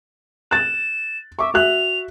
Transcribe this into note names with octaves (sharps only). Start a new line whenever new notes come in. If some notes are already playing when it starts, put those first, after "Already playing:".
F#6 A6 E7
E5 C#6 D6
F#4 E5 F#6 F7